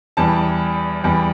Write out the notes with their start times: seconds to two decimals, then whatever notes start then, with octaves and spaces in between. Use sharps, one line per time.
0.17 E2 E3 G3 A5
1.04 E2 E3 G3